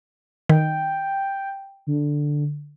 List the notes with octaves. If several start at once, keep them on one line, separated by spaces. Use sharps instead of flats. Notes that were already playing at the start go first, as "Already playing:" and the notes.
D#3 G5
D3